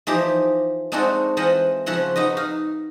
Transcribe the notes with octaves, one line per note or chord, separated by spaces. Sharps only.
E3 F3 D#4 G4
G#3 A3 C4 D4 D#4 F#4
E3 F4 C5 D#5 F#5
C#3 F3 F#4 E5 F#5 C6
D#4 F#4 B4 D#5
D#4 F5